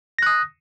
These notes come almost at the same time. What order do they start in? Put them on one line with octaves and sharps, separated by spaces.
A#6 F#6 D#6